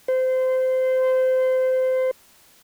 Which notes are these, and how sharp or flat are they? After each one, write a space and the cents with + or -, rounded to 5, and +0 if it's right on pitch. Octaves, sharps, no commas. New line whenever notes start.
C5 -20